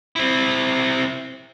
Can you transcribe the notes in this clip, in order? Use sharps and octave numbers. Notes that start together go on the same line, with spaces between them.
C4 E4